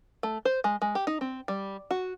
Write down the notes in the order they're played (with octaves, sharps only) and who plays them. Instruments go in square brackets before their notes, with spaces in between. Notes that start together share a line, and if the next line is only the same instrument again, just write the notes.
[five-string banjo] A3
C5
G#3
G#3
G4
D#4
C4
G3
F#4